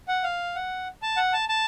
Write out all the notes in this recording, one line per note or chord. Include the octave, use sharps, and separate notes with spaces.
F#5
F5
F#5
A5
F#5
A5
A5